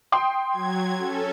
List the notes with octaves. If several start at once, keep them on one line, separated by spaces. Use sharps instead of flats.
G5 C6 D#6
F#3 G#6
C#4 A4